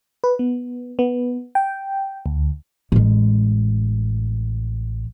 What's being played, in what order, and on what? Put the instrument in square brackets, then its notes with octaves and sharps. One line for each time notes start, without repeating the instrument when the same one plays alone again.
[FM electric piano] B4
B3
B3
G5
D2
[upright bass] A1 G#3